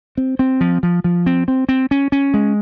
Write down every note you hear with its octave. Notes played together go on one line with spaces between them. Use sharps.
C4
C4
F3
F3
F3
C4
C4
C4
C#4
C#4
G#3